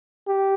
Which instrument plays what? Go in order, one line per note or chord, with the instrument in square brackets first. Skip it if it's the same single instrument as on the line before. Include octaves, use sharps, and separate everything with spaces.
[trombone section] G4